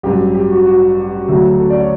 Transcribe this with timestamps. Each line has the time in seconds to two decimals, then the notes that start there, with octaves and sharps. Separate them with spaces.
0.03 A1 G2 F#3 G4
0.34 G4
0.50 F#4
0.66 F#4
1.28 D2 C#3 F#3 A3
1.59 A4
1.70 D5
1.80 C#5